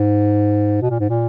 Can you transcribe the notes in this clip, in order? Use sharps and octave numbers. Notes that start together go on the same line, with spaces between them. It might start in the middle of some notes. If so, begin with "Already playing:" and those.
Already playing: G#2
B2
A#2
G#2
A#2